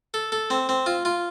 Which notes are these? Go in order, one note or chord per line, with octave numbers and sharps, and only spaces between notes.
A4
A4
C4
C4
F4
F4